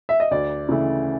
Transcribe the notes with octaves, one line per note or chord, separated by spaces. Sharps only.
E5
D#5
D2 D5
C#3 E3 A3